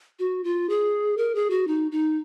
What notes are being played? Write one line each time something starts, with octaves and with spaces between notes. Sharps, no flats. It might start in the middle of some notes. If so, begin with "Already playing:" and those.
F#4
F4
G#4
A#4
G#4
F#4
D#4
D#4